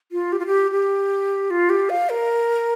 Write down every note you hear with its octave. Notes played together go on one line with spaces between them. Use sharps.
F4
G4
F4
G4
G4
F4
G4
F5
A#4